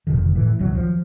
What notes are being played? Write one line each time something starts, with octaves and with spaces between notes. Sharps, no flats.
F1 A#2 D3 D#3
A2 E3
E1 C#2 D#3 F#3
F3